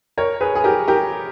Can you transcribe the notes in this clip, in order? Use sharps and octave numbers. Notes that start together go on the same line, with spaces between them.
A#4 C#5
G#4 B4
G#4
G4 A#4
G4 A#4